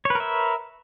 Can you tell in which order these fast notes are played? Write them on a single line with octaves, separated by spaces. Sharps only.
C#5 B4 A#4 E5